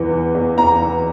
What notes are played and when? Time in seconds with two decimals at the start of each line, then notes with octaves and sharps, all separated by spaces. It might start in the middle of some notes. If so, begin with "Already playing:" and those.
Already playing: E2 E3
0.11 E3
0.35 E2
0.57 E2 A#5
0.82 E3